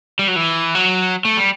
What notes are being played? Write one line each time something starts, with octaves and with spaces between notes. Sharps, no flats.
G3
F#3
E3
F#3
A3
G3